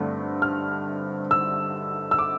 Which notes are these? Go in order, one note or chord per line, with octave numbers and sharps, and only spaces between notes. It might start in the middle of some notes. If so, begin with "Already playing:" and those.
Already playing: G2 D3 A3 C4
F6
E6
E6
D6